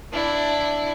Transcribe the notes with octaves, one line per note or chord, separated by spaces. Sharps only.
D4 E4